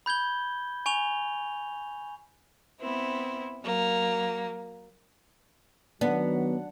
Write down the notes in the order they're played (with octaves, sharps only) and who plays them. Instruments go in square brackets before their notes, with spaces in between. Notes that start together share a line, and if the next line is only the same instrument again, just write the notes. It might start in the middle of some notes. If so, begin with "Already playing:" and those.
[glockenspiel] B5 G6 G#6 G7
G#5 C#6 F7 G7
[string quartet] B3 C4 E4
F#3 A#3
[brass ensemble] D#3 F#3 [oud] B3 [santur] D4 F#5